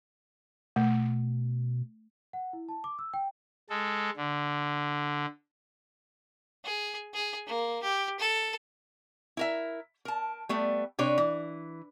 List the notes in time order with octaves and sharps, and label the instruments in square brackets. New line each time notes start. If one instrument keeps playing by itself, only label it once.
[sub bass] B2 [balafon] A3
[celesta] F#5
E4
A5
D6
E6
G5
[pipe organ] G#3 A4
D3
[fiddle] G#4
G#4
A#3
G4
A4
[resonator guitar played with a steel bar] E4 A#4 E5
A#4 A5
G3 A3 B3
C3 D4 B4 C#5
E3